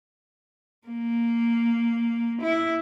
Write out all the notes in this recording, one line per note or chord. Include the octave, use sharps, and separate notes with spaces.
A#3
E4